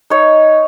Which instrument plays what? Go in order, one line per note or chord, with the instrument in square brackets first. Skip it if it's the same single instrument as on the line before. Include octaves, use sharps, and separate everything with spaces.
[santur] D#4 C#5